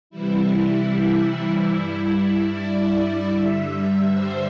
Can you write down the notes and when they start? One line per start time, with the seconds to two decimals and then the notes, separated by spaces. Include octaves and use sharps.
0.10 C3 E3 G3 E4
1.71 G2 G3
2.51 D5
3.31 G2 D3 G3 E5
4.13 C5